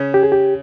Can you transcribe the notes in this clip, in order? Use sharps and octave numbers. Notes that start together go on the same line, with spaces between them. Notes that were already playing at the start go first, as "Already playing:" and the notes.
Already playing: C#3 C#4
G4
G#4
G4